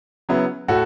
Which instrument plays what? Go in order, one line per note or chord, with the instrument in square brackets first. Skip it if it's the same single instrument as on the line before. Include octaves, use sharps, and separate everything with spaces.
[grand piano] C#3 F#3 B3 E4
A2 A3 F#4 A4